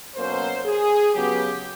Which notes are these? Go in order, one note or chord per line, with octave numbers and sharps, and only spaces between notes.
B2 F#3 A#3 C#4 C5
G#4
C#3 F#3 B3 G4